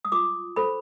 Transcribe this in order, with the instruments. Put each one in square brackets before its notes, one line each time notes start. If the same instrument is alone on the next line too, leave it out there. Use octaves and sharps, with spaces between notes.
[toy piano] D#6
F4 D6
A4 C5 B5